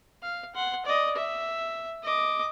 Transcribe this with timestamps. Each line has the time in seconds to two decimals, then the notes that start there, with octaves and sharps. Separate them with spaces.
0.22 F5
0.55 F#5 C6
0.85 D5 D#5
1.16 E5
2.03 D#5 D6